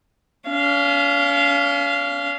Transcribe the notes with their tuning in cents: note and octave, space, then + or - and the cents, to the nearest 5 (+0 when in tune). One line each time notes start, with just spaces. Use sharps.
C#4 +40 F5 -15